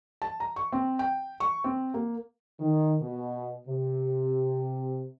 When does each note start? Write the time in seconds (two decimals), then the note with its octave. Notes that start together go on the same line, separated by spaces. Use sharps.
0.22 A5
0.40 A#5
0.56 C#6
0.72 C4
0.99 G5
1.40 C#6
1.64 C4
1.94 A#3
2.59 D#3
3.01 B2
3.68 C3